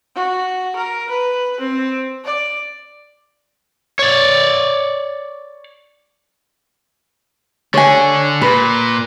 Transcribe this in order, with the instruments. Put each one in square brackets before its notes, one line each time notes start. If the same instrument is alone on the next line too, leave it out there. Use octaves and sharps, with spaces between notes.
[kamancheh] F#4
A#4
B4
C4
D5
[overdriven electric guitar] C#5 D5
[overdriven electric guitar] D3 [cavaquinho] C#5 G#5
[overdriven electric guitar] A#2 [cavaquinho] B4